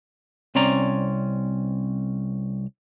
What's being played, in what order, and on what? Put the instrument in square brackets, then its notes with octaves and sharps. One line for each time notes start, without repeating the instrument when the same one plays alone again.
[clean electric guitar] C2 C4 C#4 D5 A#5